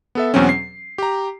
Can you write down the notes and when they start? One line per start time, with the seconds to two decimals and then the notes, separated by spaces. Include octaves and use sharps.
0.15 B3 A4 E5
0.34 E2 B2 F#3 C4 C#4
0.49 C7
0.98 G4 A#5